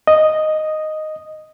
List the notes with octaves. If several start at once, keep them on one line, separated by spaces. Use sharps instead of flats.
D#5